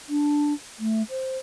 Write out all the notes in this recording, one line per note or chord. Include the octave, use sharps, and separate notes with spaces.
D4
A3
C5